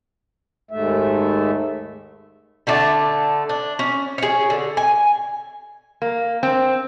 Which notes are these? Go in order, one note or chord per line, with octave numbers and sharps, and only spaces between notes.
D#2 G#2 A3 E5
D3 A3 D4 A5
D4
C#4
G#4 C#5
D3
G#5
A#3
C4